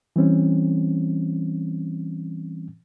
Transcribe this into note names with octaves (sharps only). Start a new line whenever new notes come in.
E3 G3 C4 C#4